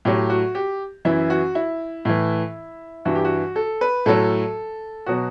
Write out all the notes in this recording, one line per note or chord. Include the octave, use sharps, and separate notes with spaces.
A2 F#3 G4
F#4
G4
F#2 E3 E4
F#4
E4
A2 E3
G2 E3 F#4
G4
F#4
A4
B4
A2 F#3 A4
B2 F#3 F#4